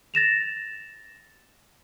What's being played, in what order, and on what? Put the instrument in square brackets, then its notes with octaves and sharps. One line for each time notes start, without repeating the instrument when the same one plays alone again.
[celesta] A6 A#6 E7 F7